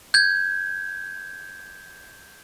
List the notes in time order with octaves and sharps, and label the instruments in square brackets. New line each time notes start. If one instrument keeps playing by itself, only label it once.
[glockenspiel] G6 G#6